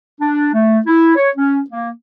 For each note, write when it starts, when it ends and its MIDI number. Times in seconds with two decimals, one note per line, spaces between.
0.21 0.49 62
0.53 0.79 57
0.86 1.15 64
1.16 1.30 73
1.36 1.60 61
1.71 1.90 58